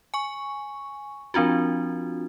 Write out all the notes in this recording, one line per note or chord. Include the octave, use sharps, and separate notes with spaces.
G#5 C#6
F3 C4 D4 F4 F#4